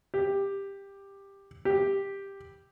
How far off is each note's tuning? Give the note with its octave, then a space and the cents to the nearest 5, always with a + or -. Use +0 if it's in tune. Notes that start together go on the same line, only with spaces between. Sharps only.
G4 +10
G4 +5